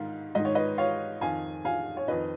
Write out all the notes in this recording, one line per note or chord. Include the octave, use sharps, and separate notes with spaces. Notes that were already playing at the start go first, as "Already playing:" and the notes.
Already playing: G#2 D#3 F5
G#2 D#3 D#5
C#5
B4 D#5
C#5 F5
F2 D#3 F5 G#5
F5 G#5
C#5
F2 D#3 B4 D#5